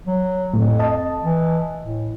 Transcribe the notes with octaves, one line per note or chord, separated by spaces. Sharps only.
F#3
F2 A2
D#5 A5
E3
A2